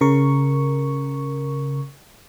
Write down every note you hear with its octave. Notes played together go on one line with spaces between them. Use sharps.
C#3 A#4 C#6